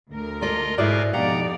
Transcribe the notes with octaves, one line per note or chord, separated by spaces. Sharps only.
D2 A#4
D3 A#3 F4 D5 D#5
G#2 B2 E4 G#4 A#4 B4 D5
F2 B2 D#4 G4 D5 F5 F#5 A#5